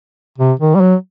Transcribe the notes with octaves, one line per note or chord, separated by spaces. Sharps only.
C3
D#3
G3
F#3